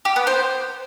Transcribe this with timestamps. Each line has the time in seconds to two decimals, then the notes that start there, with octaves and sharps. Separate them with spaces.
0.05 G4
0.16 B3
0.27 C5